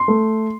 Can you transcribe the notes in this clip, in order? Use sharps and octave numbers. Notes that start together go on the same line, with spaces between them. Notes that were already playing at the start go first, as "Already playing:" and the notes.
Already playing: C6
A3